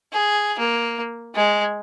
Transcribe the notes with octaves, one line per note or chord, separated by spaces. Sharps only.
G#4
A#3
G#3